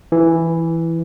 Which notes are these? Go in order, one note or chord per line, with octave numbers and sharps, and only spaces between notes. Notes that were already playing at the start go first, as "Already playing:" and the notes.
E3